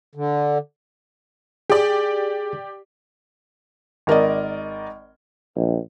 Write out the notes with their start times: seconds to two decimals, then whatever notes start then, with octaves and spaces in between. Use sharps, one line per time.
0.15 D3
1.70 G4 G#4 D5
4.07 G#1 A#4 D5 D#5
5.55 A#1